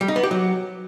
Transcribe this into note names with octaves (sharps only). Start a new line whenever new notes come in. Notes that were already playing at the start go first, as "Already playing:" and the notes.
G3
D#4
B3
G4
F#3